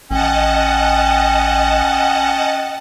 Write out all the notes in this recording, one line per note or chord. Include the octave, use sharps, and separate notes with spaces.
A1 C#4 D#5 F#5 G5 A5